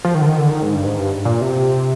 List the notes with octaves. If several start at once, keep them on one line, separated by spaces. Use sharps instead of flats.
F3
D#3
D3
D#3
D3
D#3
G#2
G2
G#2
G2
A#2
C3